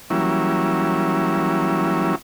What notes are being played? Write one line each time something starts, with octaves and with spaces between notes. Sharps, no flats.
E3 F#3 G3 A#3 C#4 E4